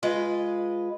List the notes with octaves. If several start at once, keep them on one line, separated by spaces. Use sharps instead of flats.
G#3 F4 B4 D#5